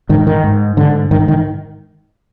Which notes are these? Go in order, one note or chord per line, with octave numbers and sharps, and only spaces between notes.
G#2 D#3
D#3
G#2
G#2 D3
G#2 D#3
D#3